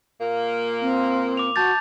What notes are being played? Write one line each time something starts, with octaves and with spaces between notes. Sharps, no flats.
A#2 A#3
C4
D6 F7
F#4 A5 G6 A6